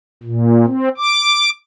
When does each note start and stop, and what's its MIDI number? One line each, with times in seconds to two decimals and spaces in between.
0.23 0.65 46
0.66 0.89 60
0.98 1.50 86